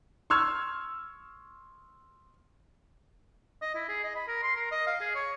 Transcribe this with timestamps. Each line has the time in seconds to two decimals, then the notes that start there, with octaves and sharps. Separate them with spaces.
0.30 C6 C#6 E6 F6 G#6
3.62 D#5
3.75 E4
3.89 G#4
4.04 D#5
4.15 B5
4.28 A#4
4.43 C6
4.57 A#4
4.72 D#5
4.87 F5
5.01 G#4
5.15 C#5